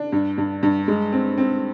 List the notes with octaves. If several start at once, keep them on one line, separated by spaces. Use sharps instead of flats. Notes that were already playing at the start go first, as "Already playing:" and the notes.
Already playing: D4
G2
G2
G2
G#3
C4
C4